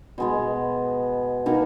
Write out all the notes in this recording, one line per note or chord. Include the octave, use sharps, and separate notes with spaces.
B2 G#3 B3
B2 A#3 D#4 A#4